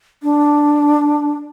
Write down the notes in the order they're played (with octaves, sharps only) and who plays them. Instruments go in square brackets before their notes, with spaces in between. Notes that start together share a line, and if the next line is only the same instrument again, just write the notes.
[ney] D4